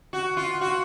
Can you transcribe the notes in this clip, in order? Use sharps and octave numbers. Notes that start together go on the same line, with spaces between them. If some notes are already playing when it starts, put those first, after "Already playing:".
F#4
F4
F#4